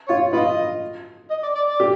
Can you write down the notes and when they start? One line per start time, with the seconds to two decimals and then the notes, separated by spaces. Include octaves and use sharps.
0.08 F4 C#5
0.33 F4 B4 D#5
1.30 D#5
1.43 D5
1.55 D5
1.67 D5
1.80 G4